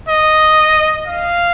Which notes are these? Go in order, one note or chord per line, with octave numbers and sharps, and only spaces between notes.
D#5
F5